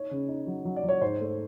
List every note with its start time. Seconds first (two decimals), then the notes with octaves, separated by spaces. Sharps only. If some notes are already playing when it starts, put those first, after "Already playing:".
Already playing: D#4 C#5
0.11 C#3
0.28 D#4
0.47 F#3
0.65 F#3
0.76 D5
0.84 F#3 C#5
1.01 G#2 C5
1.20 A3